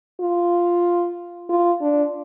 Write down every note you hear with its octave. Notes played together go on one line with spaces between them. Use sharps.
F4
F4
D4